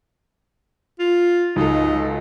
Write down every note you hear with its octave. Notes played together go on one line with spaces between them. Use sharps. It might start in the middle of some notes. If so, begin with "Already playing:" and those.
F4
C#2 D#4 F#4 A4